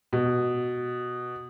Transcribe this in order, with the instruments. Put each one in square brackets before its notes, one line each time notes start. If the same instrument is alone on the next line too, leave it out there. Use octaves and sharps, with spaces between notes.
[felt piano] B2